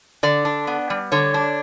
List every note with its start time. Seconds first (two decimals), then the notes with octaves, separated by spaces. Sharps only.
0.23 D3 D5
0.45 D4
0.67 B3
0.90 G3
1.12 D3 C#5
1.34 D4